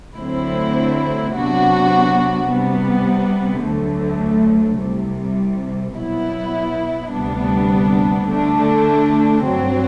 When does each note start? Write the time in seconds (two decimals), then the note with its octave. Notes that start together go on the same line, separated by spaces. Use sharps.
0.15 D2 D3 F#3 C4 E4
1.31 C3 F#3 B3 D4 F#4
2.48 C3 G3 B3
3.64 D2 D3 F#3 A3
4.80 C2 C3 G3
5.96 B2 F#3 B3 E4
7.11 D2 C3 G3 B3 D4
8.27 D3 A3 D4
9.43 G2 F#3 C4